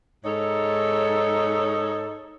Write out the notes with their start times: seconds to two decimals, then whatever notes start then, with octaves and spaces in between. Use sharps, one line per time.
0.25 G#2 D#4 A4 C#5